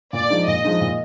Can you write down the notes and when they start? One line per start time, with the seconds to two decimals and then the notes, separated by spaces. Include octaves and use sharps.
0.13 A#2 D5
0.30 F3 G#3 D#4
0.47 A#2 D#5
0.64 F3 G#3 D#4
0.81 A#2